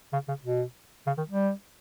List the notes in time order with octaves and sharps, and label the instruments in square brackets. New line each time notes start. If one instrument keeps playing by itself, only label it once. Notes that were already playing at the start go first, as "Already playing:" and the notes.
[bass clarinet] C#3
C#3
B2
C#3
D#3
G3